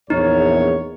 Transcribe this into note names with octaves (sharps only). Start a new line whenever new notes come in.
A#1 E2 D#4 C#5